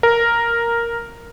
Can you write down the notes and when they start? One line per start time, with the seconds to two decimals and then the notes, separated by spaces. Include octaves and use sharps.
0.03 A#4